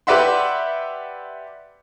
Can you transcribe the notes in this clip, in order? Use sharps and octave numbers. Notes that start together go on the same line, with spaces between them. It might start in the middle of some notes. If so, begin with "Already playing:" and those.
G4 B4 D5 E5 F#5 C6